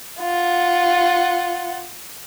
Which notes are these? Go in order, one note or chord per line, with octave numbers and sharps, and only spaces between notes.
F4 F#5